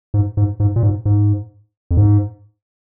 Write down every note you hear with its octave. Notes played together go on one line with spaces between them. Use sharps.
G#2
G#2
G#2
A#2
G#2
G#2
F2
G#2